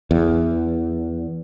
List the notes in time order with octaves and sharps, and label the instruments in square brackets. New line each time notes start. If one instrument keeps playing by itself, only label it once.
[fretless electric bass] E2